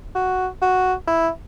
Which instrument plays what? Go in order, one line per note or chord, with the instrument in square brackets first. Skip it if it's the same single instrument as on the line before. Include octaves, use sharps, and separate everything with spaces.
[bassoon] F#4
F#4
E4